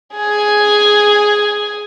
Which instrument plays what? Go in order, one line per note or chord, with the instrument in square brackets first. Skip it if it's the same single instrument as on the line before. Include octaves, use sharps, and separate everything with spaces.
[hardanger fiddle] G#4 G#5